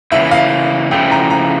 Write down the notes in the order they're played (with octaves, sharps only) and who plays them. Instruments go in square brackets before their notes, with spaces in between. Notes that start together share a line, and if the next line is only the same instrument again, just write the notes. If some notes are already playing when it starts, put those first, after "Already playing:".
[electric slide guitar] C#3 E3 A#3 E4 [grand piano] E5
[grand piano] F5
[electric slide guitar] C#3 F3 A3 E4 [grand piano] G5
[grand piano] A#5
A#5